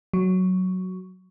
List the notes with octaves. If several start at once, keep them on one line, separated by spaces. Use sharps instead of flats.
F#3